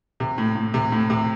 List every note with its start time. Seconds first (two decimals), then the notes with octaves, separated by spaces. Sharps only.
0.20 C3
0.38 A2
0.55 A2
0.74 C3
0.92 A2
1.10 C3